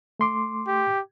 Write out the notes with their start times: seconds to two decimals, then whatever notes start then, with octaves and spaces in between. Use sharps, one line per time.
0.19 A3 C6 D6
0.67 G4